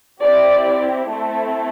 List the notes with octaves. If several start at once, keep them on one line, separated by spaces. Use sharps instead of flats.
C4 E4 G4 D5
A3 C4 E4 A4